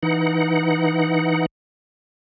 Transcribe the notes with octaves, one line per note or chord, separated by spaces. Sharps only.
E3 D#4 F#5